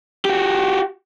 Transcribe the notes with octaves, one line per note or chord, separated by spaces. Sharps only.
F#4 G4